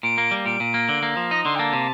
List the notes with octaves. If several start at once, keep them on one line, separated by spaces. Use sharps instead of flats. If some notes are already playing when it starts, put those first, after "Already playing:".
A#2 D7
A#3
G3
A#2 D7
A#2
A#3
D3
A#3
F3
D#4 A#6
D3 C6
G5
A#3 A5
C3